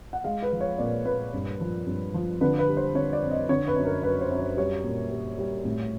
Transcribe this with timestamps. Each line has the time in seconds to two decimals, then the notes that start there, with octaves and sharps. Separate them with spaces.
0.13 F#5
0.24 G#3 F5
0.42 B4
0.52 F3
0.61 C#5
0.78 A#2 D5
1.05 A#2 B4
1.33 G2
1.61 F3
1.86 G2
2.14 F3
2.41 D3 B4
2.59 B4
2.68 G3
2.77 C5
2.95 D3 C#5
3.13 D5
3.22 F2
3.31 D#5
3.49 D3 C#5
3.68 B4
3.76 F#2
3.85 A#4
4.03 F#2 B4
4.21 C5
4.30 F#2
4.39 C5
4.57 G3 C#5
4.84 A#2
5.11 G3
5.39 G3
5.65 A2